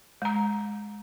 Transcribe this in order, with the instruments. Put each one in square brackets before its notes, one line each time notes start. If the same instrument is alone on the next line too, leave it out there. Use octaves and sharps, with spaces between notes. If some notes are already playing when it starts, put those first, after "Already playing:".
[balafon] G#3 A#5